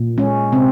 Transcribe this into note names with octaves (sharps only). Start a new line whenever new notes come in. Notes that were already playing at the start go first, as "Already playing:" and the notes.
Already playing: A#2
G#3 C#4
C3 C4